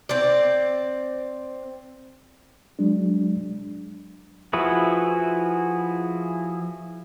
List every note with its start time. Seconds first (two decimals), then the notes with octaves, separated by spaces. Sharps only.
0.09 C4 D5
2.79 F#3 G#3 D4
4.53 F3 E4 F#4 G#4 B4